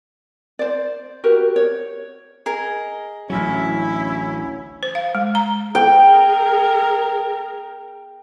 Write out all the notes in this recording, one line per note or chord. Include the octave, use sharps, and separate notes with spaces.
C5 D5
F#4 G4 A#4 B4
C#5
G#4 A#4 D#5
A1 D2 F#3 C#4 E4
C5
F5
G#3
A#5
G#4 A#4 G5